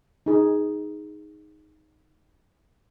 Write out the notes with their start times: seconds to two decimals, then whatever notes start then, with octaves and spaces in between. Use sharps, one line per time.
0.26 D#4 G#4